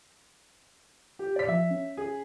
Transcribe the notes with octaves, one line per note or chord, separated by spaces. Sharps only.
G4
D5 B6
F3 E5
C#4
G#4